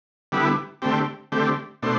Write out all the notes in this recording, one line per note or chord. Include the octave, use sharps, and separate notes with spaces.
D3 G3 B3 E4
D3 A3 C4 G4
D3 A3 C4 G4
B2 A3 D4 C5